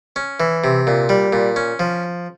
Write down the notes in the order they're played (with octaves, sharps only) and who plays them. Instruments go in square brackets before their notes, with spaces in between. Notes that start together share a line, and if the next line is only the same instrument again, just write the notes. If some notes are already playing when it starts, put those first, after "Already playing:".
[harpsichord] C#4
E3
C3
A#2
G3
A#2
C#4
F3